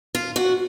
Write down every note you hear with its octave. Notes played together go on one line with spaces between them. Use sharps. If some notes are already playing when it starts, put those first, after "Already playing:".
F4
F#4